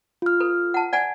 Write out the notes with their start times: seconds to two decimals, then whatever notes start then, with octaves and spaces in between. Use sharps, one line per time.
0.22 F4 F6
0.40 A4 B4
0.74 F#5 A5
0.93 D5 F#5 G#5